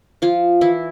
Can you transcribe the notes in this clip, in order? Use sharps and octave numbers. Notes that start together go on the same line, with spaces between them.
F3 F4
E3 E4